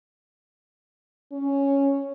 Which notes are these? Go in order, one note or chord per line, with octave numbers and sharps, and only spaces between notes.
C#4